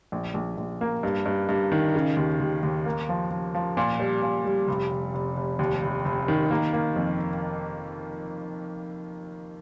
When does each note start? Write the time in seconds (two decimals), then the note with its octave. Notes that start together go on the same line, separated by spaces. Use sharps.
0.12 A#1
0.34 A#1
0.58 A#1
0.81 A#3
1.03 G2
1.26 G2
1.49 G2
1.72 D#3
1.95 C#3
2.17 D#2
2.40 D#2
2.63 D#2
2.86 A#3
3.09 F3
3.31 F3
3.55 F3
3.77 A#2
4.00 G3
4.22 A#2
4.45 G3
4.68 F1
4.91 F1
5.14 F1
5.37 F1
5.59 D#2
5.82 F1
6.05 F1
6.28 D#3
6.51 A#3
6.73 A#3
6.96 F2